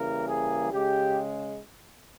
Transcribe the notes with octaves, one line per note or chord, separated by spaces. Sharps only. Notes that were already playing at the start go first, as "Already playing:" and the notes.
Already playing: C#3 E3 G3 A#3 A#4
G#4
C#3 G#3 G4